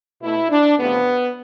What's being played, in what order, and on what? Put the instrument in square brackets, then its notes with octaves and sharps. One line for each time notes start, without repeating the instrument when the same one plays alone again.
[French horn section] B2 A3 E4
D4
E2 C3 F3 A3 B3